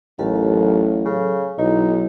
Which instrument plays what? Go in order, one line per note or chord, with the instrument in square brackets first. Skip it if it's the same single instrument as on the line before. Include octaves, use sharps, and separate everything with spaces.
[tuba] A1 [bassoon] D#2 [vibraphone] F#3 A4 F5
[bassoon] C#3
[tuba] B1 [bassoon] D#4 [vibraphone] E4